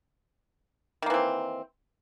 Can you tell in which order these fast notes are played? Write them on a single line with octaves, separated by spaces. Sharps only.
D#3 A#3 E3 C4